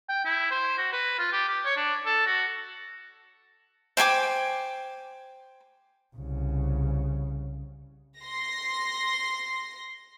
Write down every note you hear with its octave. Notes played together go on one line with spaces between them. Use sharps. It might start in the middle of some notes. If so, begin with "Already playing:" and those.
G5
E4
C5
F#4
B4
F4
G4
G4
C#5
D4
A4
F#4
C5 G5 G#5 D6
C2 C#3
C6 A#6